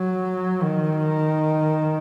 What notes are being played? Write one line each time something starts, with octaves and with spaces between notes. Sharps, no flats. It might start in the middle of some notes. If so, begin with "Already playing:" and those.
Already playing: F#3
D#3